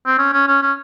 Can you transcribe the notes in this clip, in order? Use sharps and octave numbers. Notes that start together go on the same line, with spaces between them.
C4
C#4
C#4
C#4
C#4